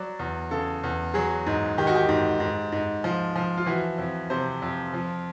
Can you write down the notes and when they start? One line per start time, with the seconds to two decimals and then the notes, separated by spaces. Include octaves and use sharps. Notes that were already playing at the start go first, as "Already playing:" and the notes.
Already playing: F#3 D5
0.19 E2
0.51 C#3 A4
0.83 E2
1.14 F#3 G#4
1.47 G#2
1.78 D#3 G4
1.87 F#4
1.96 G4
2.09 G#2
2.40 G#2
2.72 G#2
3.04 F3
3.36 F3
3.57 F4
3.66 E3 F#4
3.98 F2
4.30 C3 C5
4.62 F2
4.93 F3